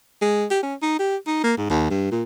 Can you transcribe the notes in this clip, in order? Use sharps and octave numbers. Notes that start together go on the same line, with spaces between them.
G#3
G4
C#4
D#4
G4
D#4
A#3
G#2
D#2
G2
A#2